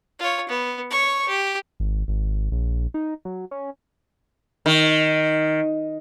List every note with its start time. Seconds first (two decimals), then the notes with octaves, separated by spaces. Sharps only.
0.19 F4 C#5
0.48 B3
0.91 C#5 C#6
1.28 G4
1.80 G#1
2.08 G#1
2.52 A#1
2.94 D#4
3.25 F#3
3.51 C#4
4.66 D#3